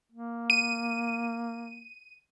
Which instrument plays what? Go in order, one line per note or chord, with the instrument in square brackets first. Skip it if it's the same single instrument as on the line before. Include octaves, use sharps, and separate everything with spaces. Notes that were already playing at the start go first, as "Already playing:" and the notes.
[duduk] A#3
[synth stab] D#7